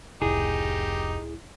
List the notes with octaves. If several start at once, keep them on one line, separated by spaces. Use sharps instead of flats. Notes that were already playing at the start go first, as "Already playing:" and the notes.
F1 C#2 A2 D#4 E4 G4 G#4